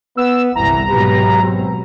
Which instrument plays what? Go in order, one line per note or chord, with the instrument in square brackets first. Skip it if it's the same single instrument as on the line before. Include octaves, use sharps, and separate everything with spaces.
[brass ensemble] B3 [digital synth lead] E6
[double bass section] G1 C2 [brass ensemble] E3 [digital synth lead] A#5
[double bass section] G#1 B2 F#3 [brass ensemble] G4 B4
[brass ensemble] C4